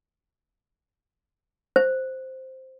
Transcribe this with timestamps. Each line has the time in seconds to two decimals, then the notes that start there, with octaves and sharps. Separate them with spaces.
1.76 C5